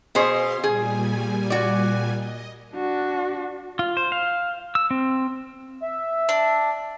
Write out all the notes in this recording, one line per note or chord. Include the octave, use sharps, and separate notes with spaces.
B2 G#4 C5 F5 C6
A#2 G3 G#4 G#5
F#4 D5
D#5
D4 F#4
F4
C5
F5
E6
C4
E5
D4